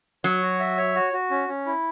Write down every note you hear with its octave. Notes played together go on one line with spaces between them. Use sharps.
F#3 C#5
F#4
E5
C#5
F#4
F#4
C#4
C#4
E4